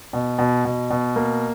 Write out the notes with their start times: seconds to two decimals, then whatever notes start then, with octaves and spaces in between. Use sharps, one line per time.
0.13 B2
0.39 B2
0.65 B2
0.90 B2
1.16 A#3